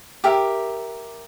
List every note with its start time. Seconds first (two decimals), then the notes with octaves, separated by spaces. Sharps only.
0.24 G4 A#4 E5